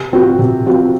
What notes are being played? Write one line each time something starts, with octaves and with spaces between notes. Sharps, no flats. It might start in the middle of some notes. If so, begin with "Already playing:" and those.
Already playing: C3
F3 C4 F#4
C3
F3 C4 F#4